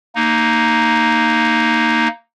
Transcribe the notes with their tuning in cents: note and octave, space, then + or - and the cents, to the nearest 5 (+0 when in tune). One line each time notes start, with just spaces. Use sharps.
A#3 -10 D#4 +0